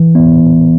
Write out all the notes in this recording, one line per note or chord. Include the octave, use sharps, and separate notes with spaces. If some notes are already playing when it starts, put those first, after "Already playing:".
Already playing: E3
B3